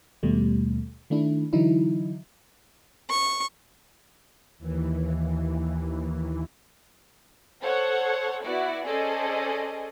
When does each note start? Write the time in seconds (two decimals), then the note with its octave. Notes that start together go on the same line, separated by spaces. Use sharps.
0.23 D#2 B2 G3 A3
1.10 D#3 A3 D4 E4
1.53 D3 E3 F#3 D#4 E4
3.10 C#6
4.58 D#2 E3
7.61 A4 C5 C#5 F#5
8.42 B3 E4 F#4 D5
8.85 C#4 G#4 A4 C5 D5 D#5